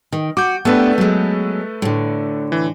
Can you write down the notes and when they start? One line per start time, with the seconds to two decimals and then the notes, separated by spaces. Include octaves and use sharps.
0.12 D#3
0.37 F#4 D6 G6
0.65 A3 B3 D4 G4 A4 B4
0.98 F#3 G#3
1.82 A2 D3
2.52 E3